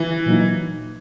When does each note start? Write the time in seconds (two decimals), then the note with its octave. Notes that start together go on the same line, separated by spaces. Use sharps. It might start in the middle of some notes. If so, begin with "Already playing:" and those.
Already playing: E3
0.26 A#2 F#3 A#3 D#4